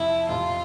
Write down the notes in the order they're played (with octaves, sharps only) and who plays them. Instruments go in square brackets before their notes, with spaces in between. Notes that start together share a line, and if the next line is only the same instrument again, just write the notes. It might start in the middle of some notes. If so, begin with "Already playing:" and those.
Already playing: [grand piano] F2 C3 F3 [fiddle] E4
[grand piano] F2 C3 F3 [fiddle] F4